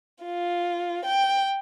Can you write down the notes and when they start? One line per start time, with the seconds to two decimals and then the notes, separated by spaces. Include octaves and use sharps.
0.25 F4
1.06 G5